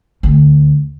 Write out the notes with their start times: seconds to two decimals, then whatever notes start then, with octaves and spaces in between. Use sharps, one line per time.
0.23 D2